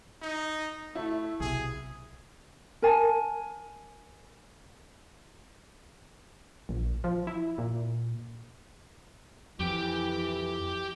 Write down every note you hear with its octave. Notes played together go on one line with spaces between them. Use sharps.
D#4
A3 E4
B1 C3 G#4
A#4 G#5 A5
A#1
F3
E4
A#2
F2 E3 G4 G5